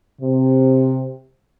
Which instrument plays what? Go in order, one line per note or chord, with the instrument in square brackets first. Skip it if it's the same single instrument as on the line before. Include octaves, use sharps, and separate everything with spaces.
[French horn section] C3